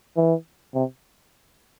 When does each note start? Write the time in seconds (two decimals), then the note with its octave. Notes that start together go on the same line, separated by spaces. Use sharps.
0.17 E3
0.75 C3